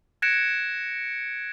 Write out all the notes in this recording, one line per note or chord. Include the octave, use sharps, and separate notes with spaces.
F#6 G#6 A#6 C#7 D7 E7